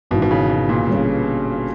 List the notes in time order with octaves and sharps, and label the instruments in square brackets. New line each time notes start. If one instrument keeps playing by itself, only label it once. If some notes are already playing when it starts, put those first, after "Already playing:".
[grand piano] G#1 G#2 E3 [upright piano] B2
[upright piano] B2
C#3
B2
A#2
[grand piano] G1 G2 G3 C#4 G#4